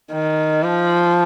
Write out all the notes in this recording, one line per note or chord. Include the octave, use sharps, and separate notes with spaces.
D#3
F3